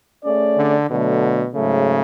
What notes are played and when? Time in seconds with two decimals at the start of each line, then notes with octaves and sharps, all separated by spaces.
0.24 A3 C#4 G#4 D5
0.57 D3
0.90 B2 D3 F#3 A3
1.54 G#2 C#3 F#3 A3